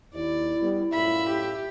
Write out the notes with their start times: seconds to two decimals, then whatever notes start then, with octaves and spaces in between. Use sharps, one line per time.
0.14 D#2 E4 D5
0.60 G3 B3
0.93 F#2 A2 F4 E5 B5
1.30 G4